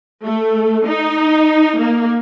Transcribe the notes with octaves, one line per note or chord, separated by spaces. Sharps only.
A3
D#4
A#3